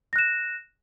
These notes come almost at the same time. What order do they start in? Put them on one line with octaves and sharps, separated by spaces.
A#6 F#6 E7